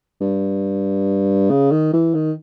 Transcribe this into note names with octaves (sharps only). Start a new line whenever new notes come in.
G2
C#3
D#3
E3
D#3